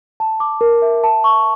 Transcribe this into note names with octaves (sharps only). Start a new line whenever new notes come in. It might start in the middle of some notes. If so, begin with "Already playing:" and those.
A5
D6
A#4
E5
A5
C#6